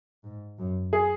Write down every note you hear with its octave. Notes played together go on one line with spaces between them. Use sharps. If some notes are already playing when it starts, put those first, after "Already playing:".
G#2
F#2
G#4